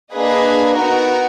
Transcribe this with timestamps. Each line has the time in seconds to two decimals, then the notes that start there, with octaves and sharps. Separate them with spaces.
0.13 A#3 D4 G#4 B4 D#5
0.76 B3 D#4 F#4 A#4